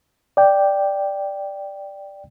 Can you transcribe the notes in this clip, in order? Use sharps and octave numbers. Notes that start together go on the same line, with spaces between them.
D5 G5